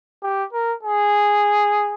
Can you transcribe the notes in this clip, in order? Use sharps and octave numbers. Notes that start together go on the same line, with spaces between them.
G4
A#4
G#4